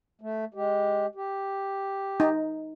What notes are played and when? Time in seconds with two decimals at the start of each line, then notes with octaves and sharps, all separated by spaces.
0.21 A3
0.54 G#3 G4
1.15 G4
2.20 D#4